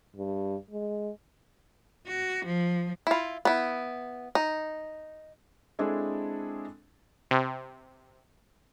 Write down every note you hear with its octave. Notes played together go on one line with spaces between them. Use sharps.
G2
G#3
F#4
F3
E4 F4
B3 E4
D#4
G#3 C4 D4 E4 G#4 A4
C3